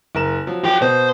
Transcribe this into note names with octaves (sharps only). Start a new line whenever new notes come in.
F#1 A#4 E7
F3 F#3
F#4 G5
B2 C5